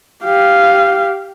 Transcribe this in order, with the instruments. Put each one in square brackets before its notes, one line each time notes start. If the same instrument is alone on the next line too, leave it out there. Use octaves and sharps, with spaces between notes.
[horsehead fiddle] G4 F5